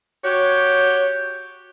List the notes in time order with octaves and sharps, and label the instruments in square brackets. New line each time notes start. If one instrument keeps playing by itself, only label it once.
[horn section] F#4 C#5 [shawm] G4